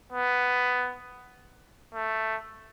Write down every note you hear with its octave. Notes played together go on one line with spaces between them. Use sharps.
B3
A3